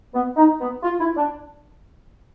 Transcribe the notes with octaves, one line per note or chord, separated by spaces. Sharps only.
B3
D#4
B3
F4
E4
D4